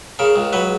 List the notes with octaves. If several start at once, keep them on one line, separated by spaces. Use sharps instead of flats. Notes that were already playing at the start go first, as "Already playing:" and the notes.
C#3 A#4
C#2
F#3 B4